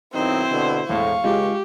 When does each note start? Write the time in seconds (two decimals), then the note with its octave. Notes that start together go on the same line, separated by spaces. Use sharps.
0.14 B1 D#3 C4 D#4 E4 C5
0.50 B2 D3
0.89 E1 A2 F5 C#6
1.24 C#2 G#3 F4 G4